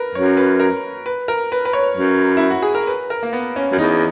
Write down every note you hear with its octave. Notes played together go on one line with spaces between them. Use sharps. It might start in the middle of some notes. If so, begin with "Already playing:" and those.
Already playing: A#4 B4
F#2 C#5
B4
A#4
B4
A#4
B4
B4
C#5
F#2
E4
F#4
G#4
A#4
B4
A#4
A#3
B3
C#4
F#2
E2 D#4